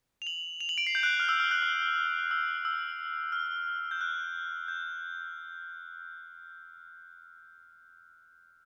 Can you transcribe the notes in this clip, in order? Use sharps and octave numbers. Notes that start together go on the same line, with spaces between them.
F7
F#7
F7
F#7
D7
C7
G6
F#6
F6
E6
F6
F#6
F6
E6
E6
F6
G6
F#6
G6